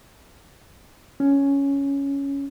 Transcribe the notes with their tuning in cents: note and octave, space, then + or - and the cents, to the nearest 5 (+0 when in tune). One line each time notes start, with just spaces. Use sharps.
C#4 +5